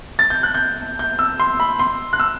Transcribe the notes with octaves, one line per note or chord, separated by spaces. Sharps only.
A6
G6
F#6
G6
G6
E6
C6
B5
C6
F#6
E6